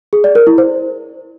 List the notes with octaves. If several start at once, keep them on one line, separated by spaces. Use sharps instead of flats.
G#4
D5
A#4
E4
C5